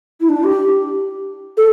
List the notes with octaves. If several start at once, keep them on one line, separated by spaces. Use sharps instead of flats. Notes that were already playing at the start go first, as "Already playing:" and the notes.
E4
D4
G4
A4